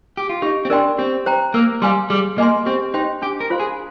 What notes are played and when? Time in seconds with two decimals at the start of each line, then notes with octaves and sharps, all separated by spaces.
0.17 G4
0.29 F4
0.42 D#4 G4
0.65 C4
0.70 D4 A#4 D5 G5 C6
0.98 C4 G4
1.26 C5 G5 A#5
1.54 A#3 A#4
1.82 G3 F5 G#5 C6
2.10 G3 G#4
2.38 A#3 D#5 G#5 C6
2.66 C4 G4
2.94 D#4 C5 G5 C6
3.22 D4 G4
3.40 A#4
3.50 F4 C5 F5 C6
3.60 G#4